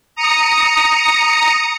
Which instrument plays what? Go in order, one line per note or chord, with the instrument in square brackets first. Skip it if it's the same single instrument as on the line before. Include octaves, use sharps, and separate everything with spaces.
[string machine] A#5 D#6 C#7